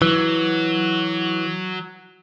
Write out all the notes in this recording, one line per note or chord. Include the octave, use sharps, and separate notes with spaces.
E3 F#3